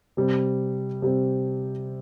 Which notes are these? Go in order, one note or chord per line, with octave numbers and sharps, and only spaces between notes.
C3 G3 C4
C3 G3 C4